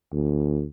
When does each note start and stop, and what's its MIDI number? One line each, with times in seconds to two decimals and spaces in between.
0.12 0.66 38